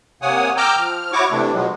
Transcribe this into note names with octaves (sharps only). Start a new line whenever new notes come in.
C3 A#3 C#5 F#5 G#5 D#6
G5 A#5 D6 E6 F6 G6
F3 F6
E4 F#4 C#5 C#6 D6
C3 E3 A3 D4
B2 F3 F#3 G#3